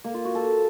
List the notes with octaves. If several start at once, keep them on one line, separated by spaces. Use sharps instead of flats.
A#3
F4
F#4
A4